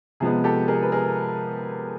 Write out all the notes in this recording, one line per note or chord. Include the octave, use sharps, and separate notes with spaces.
C3 F3 G#3 B3 G#4
G4 A4
G#4 A#4
B4
G#4 A#4